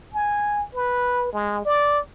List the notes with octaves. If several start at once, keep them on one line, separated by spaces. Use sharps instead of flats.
G#5
B4
G#3
D5